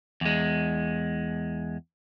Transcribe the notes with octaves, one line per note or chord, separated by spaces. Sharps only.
E2 G#3